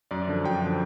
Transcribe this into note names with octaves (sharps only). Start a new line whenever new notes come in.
F#2 D5
D3 F3
F#2 G5
D3 F3